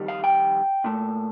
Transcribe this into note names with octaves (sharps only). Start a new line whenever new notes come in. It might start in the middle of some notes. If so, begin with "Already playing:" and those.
Already playing: F2 D#3 G3
F5
G5
A#2 A3